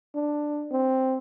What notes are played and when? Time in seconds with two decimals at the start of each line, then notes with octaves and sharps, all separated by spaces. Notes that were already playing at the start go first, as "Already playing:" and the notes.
0.15 D4
0.71 C4